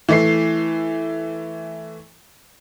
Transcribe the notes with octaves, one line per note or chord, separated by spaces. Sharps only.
E3 A3 C7